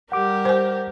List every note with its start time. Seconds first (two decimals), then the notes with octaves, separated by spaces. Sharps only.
0.12 G3 G4 A#4 F#5 D6
0.45 C5 G#5